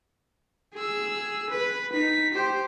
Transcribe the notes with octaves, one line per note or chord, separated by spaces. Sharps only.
G#4 E6
B4
D#4 B6
G4 C5